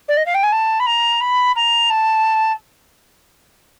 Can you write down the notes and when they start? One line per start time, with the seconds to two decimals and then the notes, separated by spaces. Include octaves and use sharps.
0.08 D5
0.17 D#5
0.26 F5
0.34 G5
0.43 G#5
0.52 A5
0.80 B5
0.86 A#5
1.21 B5
1.56 A#5
1.90 A5